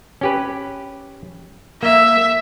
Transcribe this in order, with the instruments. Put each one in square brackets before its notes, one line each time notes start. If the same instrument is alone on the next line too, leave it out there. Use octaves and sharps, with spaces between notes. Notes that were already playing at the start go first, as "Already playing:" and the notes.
[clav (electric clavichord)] C#4 G4 B4
[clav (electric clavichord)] A#3 [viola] E5